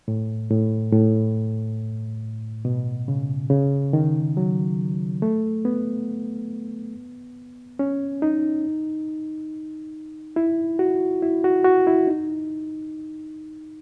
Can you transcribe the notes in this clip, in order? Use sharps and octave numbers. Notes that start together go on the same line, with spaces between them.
A2
A2
A2
B2
C#3
C#3
D#3
F#3
A3
B3
C#4
D#4
E4
F#4
E4
F#4
F#4
E4
D#4